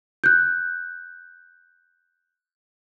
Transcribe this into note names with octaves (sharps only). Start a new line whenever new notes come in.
F#6 G6